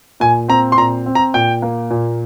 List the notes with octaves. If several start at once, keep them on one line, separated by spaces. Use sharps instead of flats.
A#2 G#5
C4 A#5
C6
A#2 A#5
C4
A#5
A#2 G5
A#3
A#2